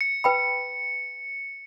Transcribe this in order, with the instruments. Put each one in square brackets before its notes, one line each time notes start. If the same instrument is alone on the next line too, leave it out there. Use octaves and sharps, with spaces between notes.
[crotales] C#7
[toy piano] B4 G5 B5